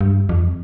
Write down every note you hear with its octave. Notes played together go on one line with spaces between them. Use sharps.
G2
F2